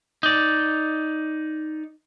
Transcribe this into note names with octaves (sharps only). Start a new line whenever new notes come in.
D#4 D5